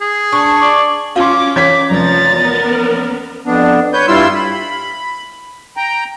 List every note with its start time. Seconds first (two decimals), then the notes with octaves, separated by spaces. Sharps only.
0.01 G#4
0.32 D4 C#6
0.62 D5
1.16 C#4 F4 F5 C6 D6
1.56 E3 C#4 C#5 D6 G#6 B6
1.90 F1 F3 A#5 A6
2.37 B3 A#4
3.46 F2 B3 D4
3.93 B4 C#5 G6
4.07 G2 G3 E4 F4 C6 E6
4.34 B5
5.77 G5 A#5